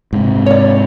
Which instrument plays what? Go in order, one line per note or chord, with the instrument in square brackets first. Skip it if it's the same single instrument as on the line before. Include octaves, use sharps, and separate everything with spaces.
[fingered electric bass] G#2 C3
[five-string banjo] C#5 D5